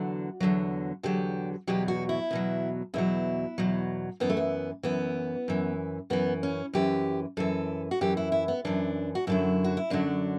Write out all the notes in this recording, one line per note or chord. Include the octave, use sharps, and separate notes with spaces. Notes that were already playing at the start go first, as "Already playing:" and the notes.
Already playing: E2 D3 F#3 F#4
E2 D3 F#3
E2 D3 F#3 G4
E2 B2 F#3 G4
F#4
E4
E2 B2 F#3
E2 B2 F#3 E4
E2 B2 F#3
F#2 E3 B3
A3
B3
F#2 E3 B3
F#2 E3
F#2 E3 B3
C#4
F#2 E3 G4
F#2 E3 A4
F#4
F#2 E3 G4
E4
E4
B3
F#2 E3 D4
F#4
F#2 D3 F#3 E4
F#4
E4
F#2 D3 F#3 D4